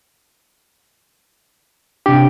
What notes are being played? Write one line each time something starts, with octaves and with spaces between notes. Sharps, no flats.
C3 D4 G4